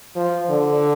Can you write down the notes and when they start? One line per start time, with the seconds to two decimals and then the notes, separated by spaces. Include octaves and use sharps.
0.16 F3
0.50 D3